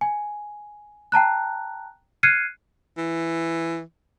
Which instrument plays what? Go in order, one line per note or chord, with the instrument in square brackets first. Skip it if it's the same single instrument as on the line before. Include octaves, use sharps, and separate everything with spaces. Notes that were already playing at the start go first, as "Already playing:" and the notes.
[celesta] G#5
G5 A5 A#5 F#6
F6 F#6 G#6 C7 C#7 D#7
[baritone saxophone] E3